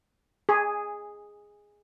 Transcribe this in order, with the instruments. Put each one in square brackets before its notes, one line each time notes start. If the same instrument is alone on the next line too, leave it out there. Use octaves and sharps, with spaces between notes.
[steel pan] G#4